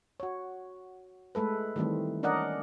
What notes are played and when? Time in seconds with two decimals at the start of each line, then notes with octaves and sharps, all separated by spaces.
0.20 F#4 C#5
1.35 G#3 A3 A4 B4
1.76 D#3 E3 G3 A3 C4
2.23 C#4 D4 A#4 D5 D#5 F#5